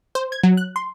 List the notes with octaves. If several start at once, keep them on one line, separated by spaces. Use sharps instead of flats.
C5
G#6
F#3
F#6
C6